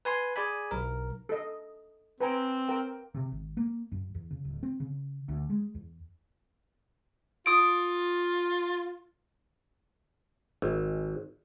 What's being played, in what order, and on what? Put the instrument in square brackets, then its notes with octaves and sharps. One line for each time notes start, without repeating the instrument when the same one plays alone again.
[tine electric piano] B4 G#5 C6
G#4 D5 G#5 B5
B1 A#4
[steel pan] A4 D#5
[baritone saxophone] C4 [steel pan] B4 G#5 A#5
[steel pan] A#4 G5
[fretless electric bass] C3
G#1
A#3
F#2
E2
C#3
D1
C4
C#3
D2
G#3
E2
[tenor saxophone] F4 [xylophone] D#6 D7
[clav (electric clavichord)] G#1